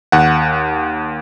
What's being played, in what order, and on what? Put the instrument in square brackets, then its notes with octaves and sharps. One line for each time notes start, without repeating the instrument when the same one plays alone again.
[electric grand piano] D#2 F#5